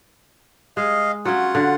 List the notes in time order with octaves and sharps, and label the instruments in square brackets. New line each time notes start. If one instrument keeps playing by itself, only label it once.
[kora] G#3 [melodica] D#5 F5
[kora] F#3 C#4 [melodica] F4 F#5
[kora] D3